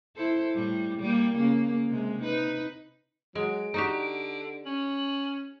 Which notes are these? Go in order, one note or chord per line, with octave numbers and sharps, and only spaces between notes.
E4 A4 C5
A2 G3
G3 A#3
C#3 A#3
C3 G#3
D#4 B4
F#3 G#3 D7
D3 D#4 F#4 G4
C#4 F#7